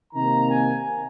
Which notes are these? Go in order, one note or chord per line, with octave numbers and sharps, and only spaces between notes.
C3 D#3 A#3 A#5
G#5